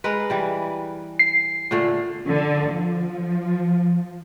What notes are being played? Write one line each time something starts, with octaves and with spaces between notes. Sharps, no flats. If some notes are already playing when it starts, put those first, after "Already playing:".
G#3 A#4 B4
E3 G3
C7
A#2 D3 A3
D3
F3